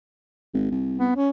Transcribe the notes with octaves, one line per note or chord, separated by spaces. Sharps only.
G#1
C2
B3
C#4